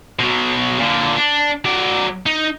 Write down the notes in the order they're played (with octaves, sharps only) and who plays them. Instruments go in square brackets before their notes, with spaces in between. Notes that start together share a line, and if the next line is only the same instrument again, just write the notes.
[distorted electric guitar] B2 F#3
A#2 D3
D4
F#3 D5
D#4